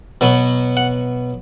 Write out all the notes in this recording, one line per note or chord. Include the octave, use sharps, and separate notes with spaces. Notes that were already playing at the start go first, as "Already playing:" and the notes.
B2 F#3 B3
F#5